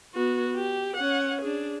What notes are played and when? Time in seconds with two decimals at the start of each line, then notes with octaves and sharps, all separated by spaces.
0.15 B3 F#4
0.55 G4
0.96 C#4 F#5
1.42 D4 G#4